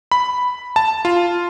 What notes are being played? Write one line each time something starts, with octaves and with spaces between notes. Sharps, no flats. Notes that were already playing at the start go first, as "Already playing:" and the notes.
B5
A5
F4